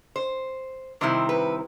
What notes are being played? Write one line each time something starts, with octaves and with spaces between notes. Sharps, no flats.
C5
C3 D#3 G3 C4 E4 C5
B4